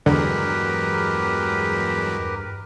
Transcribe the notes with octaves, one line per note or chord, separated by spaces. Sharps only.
E2 G2 D3 F#3 G#3 G4 A#4 B4